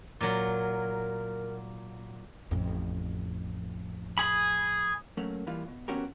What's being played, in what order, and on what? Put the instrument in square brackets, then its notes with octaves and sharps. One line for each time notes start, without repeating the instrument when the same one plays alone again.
[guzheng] A#2 F#3 [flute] A#4
[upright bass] A1 F2
[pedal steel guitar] G#4 B5
[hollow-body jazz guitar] F#3 A3 A#3 C#4
E3 G3 A#3 F4
B2
F3 B3 C#4 F#4 G4 A#4